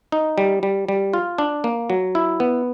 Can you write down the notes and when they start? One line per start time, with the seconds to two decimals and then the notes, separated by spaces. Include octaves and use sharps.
0.12 D#4
0.38 G3
0.63 G3
0.89 G3
1.13 F4
1.38 D4
1.64 A#3
1.90 F#3
2.15 E4
2.40 B3